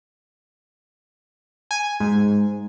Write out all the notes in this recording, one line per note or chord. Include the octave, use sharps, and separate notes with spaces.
G#5
G#2